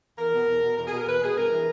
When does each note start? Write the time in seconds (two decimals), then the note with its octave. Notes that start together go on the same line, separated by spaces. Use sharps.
0.18 E2 A#4
0.33 B2
0.48 E2
0.62 B2
0.77 E2 A#4
0.87 G#4
0.92 B2 A#4
1.07 E2 B4
1.21 B2 G#4
1.36 G2 A#4
1.51 E3